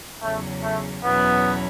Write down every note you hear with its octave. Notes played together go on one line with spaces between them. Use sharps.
E2 C#3 F#3 A3 C#4
A3
E2 B2 F#3 B3 C#4 E4